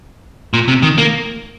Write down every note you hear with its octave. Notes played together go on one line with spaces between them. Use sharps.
A#2
C3
D#3
A#3